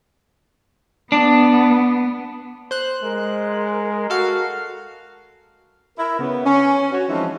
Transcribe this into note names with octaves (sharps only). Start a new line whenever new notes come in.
B3 D4
C5 F#6
G#3 A#4
F#4 A4 F5
E4 A#4
C#3 B3
C#4
F#4 C#5
E3 F3 G#3 C4 C#4 D#4